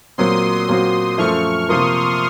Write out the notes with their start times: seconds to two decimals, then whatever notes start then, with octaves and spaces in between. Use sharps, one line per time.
0.18 A#2 F#3 C4 C6 D#6
0.69 A#2 F#3 C4 F#4
1.18 F#2 F3 A3 C#6 F6
1.69 C3 F3 A#3 F4 A#4 C6 D#6